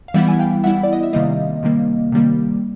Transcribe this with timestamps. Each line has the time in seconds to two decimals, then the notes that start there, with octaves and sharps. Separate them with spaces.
0.08 F5
0.14 E3 G3 B3 E4 E5 F#5
0.28 G#5
0.39 F5 G5
0.64 E3 G3 B3 E4 E5 F#5
0.83 D5
0.93 D#5
1.03 E5
1.13 C3 D#3 G3 A#3 D#5 F5
1.63 C3 D#3 G3 A#3
2.12 C3 D#3 G3 A#3